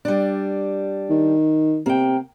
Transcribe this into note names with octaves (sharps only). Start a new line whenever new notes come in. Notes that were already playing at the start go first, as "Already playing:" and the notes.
G3 D4
D#3
C3 A#3 G5